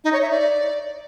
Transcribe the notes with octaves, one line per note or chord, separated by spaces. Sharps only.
D#4
C#5
E5
D5